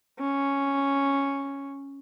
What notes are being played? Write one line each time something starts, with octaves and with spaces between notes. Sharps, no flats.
C#4